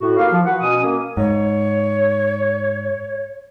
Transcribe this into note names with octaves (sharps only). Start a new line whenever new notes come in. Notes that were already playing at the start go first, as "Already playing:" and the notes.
A2 F#4
A#3 E4 G4 F5
F3
F#4 B4 F#5
B2 C#4 D#6
A#3 C#4
G#2 C#5